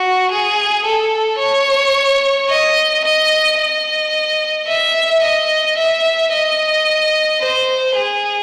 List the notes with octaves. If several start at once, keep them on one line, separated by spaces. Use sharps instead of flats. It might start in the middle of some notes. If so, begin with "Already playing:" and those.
Already playing: F#4
G#4
A4
C#5
D#5
D#5
D#5
E5
D#5
E5
D#5
C5
G#4